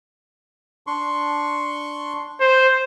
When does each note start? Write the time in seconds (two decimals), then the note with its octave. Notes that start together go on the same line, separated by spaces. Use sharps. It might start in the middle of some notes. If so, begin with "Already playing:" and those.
0.87 D4 C6 C#6
2.40 C5